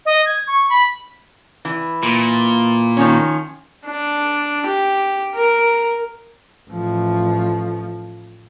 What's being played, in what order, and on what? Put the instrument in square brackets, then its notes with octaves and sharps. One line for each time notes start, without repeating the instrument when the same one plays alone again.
[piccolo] D#5
G#6
C#6
B5
[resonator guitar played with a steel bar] E3
[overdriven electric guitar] A#2
[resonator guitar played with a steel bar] D#3 F3 C#4
[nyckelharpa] D4
G4
A#4
[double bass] A1 F3